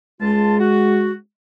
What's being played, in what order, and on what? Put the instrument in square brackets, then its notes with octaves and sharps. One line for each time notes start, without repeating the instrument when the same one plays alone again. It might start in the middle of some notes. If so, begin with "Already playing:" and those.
[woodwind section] C#2 F4 A5 [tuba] G#3
[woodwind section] F#4